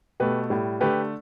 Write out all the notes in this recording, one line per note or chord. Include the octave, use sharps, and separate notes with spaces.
B2 A3 G4 B4
A2 G3
D3 A3 G4 B4